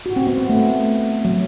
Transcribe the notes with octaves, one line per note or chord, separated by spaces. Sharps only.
F#4
C4
B3
B3
A3
F#3